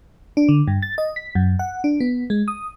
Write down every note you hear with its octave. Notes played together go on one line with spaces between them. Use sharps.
D4
D3
G2
A6
D#5
B6
F#2
F#5
D4
B3
G#3
D#6